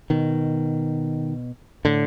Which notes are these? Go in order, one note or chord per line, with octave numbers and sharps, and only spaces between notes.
B2 D#3
A2 D3